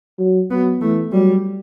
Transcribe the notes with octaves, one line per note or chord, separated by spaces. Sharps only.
F#3
F#3 B3
E3 A3
F#3 G3